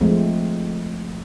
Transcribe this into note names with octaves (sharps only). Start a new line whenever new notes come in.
F3 G#3 A3 C4